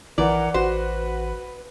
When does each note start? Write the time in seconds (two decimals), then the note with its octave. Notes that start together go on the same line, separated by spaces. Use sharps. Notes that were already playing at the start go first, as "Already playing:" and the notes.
0.18 A#1 E3 A#4 D5 F#5 A#5
0.54 A1 F#4 B4 C5